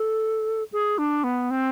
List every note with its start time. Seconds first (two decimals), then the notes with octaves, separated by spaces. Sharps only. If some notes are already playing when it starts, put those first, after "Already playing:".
Already playing: A4
0.72 G#4
0.98 D4
1.24 B3
1.50 C4